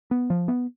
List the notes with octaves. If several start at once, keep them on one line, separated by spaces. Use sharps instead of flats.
B3
F3
B3